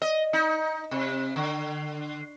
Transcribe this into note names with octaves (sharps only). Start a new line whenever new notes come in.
D#5
D#4
C3
D3